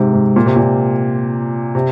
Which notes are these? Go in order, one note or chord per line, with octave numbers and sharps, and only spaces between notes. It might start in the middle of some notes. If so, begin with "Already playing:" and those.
Already playing: G#2 C3
G#2
A#2
C3
A#2
C3